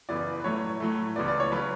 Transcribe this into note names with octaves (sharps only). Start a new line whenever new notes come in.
F#2 C#3 E3 B3 D5
B4
A2 F#3 A3 C#5
A2 F#3 A3
C#2 C#3 E3 B3 D5
D5
C#5
C#3 F#3 B4